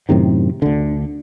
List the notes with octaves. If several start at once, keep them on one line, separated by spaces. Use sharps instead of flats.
F#2 A2 C3 D#3
D2 D3